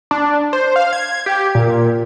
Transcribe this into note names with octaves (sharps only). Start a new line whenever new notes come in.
D4
C5
F5
G#6
G4
A#2